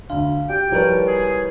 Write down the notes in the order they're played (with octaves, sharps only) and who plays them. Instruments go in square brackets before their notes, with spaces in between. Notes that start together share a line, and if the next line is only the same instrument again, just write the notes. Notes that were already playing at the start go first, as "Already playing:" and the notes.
[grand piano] D2 [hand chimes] F5
[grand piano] G4 [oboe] G5
[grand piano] F3 G3 A#4 [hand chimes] E4 B4 C#5
[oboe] G#4